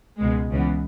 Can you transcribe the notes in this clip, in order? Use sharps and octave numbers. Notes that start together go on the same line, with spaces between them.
C#2 B2 G#3
C#2 C#3 E3 B3